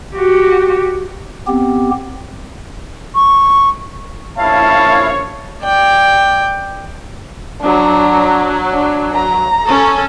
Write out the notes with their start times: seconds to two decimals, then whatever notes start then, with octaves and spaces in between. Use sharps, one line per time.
0.15 F#4 G4
1.48 B3 C4 G4
3.15 C#6
4.37 A#1 F#2 E4 C#5 F5 A5
5.63 D5 G5
7.62 F#3 D4 A#5
8.71 D4
9.14 A#5
9.65 C#4 A4